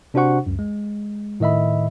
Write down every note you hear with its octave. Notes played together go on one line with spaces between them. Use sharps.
C3 D4 F#4 C5 F#5 C#6
C#2 F#2
G#3
A2 D#3 D#5 E5 B5